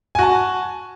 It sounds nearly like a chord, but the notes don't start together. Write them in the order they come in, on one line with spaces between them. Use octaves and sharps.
G#5 F#4 A5